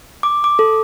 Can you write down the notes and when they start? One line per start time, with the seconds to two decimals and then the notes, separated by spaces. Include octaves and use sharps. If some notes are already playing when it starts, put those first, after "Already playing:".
0.23 D6
0.44 D6
0.59 A4